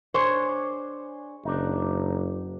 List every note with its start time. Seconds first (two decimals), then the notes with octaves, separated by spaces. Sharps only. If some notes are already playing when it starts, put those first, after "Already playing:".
0.14 D4 G#4 C5 C#5
1.45 F#1 D4 D#4